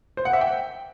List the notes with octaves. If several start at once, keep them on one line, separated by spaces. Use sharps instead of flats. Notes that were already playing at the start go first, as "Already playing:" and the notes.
C5
F#5
E5
G5